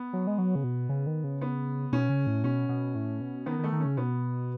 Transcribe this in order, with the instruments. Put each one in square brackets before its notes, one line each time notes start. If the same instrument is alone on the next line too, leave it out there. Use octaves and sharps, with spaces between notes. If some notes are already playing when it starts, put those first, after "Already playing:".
Already playing: [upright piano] B3
[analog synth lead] F#3
G#3
F#3
C#3
B2
C#3
D#3
C#3
[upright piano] B3
[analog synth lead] B2 [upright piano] C#4
[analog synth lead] C#3
A2
[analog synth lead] B2 [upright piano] C#4
[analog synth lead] B2
A2
B2
[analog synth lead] D#3 [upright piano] B3
[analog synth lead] D#3
[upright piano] A3
[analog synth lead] D#3
[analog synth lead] C#3 [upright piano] C#4
[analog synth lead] B2 [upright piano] B3